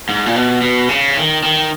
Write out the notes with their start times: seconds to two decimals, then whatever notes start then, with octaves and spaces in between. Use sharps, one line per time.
0.09 G#2
0.26 A#2
0.36 B2
0.62 B2
0.89 C#3
1.16 D#3
1.43 D#3